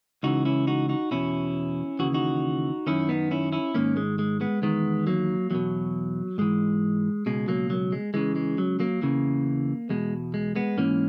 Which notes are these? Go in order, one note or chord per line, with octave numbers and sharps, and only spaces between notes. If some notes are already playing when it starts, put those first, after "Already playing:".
C#2 C#3 E3 D#4 F#4
C#4 E4
D#4 F#4
D#4 F#4
E2 B2 C#4 E4
D#2 C#3 E3 F#4
D#4 F#4
F#2 D#3 C#4 E4
B3 D#4
C#4 E4
C#4 E4
G#2 D#3 A#3 C#4
G#3
G#3
G#3 B3
E2 D#3 G#3 B3
F#3 A#3
E2 B2 F#3
G#2 E3 G#3
C#2 B2 G#3
F#3 A#3
F#3
G#3
C#2 C#3 E3 G#3
G#3
F#3
F#3 A#3
E2 C#3 E3
E2 B2 G#3
G#3
G#3 B3
G#2 E3 A#3 C#4